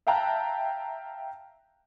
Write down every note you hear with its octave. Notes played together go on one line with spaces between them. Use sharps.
E5 F5 G5 A5 A#5 F#6